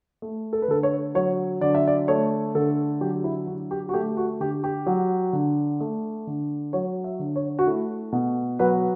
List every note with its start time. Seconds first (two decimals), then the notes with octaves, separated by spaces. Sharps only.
0.22 A3
0.53 A4
0.62 B4
0.68 D3 A4
0.83 C#5
1.15 F#3 C#5
1.61 D3 D5
1.75 E5
1.87 D5
2.08 A3 C#5
2.55 D3 A4
3.01 F#3 G4
3.24 E4
3.47 D3 F#4
3.71 G4
3.89 F#4
3.93 A3 G4
4.17 F#4
4.40 D3 G4
4.64 G4
4.86 F#3
5.33 D3
5.80 A3
6.27 D3
6.73 F#3 C#5
7.04 E5
7.19 D3
7.36 C#5
7.59 F#4
7.67 A3 E4
8.12 B2
8.59 F#3 B4